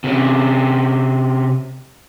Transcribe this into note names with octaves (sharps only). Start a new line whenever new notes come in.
C3 C#4